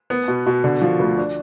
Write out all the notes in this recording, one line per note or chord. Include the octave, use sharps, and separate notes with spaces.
B3
B2
B2
D3
F3
D2
D4